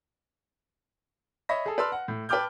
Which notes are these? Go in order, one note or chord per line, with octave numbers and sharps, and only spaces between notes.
C#5 D#5 E5 B5 A#6
G#4 A4
B4 D5 A5 C6 E6 F6
F#5
A2
B4 G5 A5 D6 F6 G6